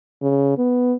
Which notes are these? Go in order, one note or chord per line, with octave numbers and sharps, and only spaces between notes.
C#3
B3